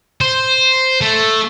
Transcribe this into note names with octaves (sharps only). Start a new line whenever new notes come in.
C5
A3